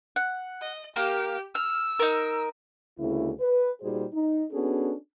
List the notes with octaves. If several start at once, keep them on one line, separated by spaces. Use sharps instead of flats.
F#5
D#5
A#3 G4
E6 F6
D#4 A#4
D2 C#3 G#3 A#3 E4
B4
A#2 G3 D#4 F#4 G#4 C5
D#4
B3 C#4 D4 F#4 G#4 A4